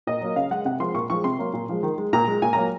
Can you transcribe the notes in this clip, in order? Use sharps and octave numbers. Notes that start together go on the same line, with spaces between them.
A#2 D#5
F#3 A#3
C#3 F5
G#3 F#5
C3 F#5
F3 G#3 C6
A#2 C#6
F3 G#3 C#6
C3 C6
F#3 A#3
A#2
F3 G#3
D#3
G#3
A#2 A#5
G#3
A#2 G#5
F#3 A#3 A#5